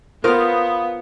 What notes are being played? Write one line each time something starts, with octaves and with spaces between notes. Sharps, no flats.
B3 F4 A#4 C5 F5 D#6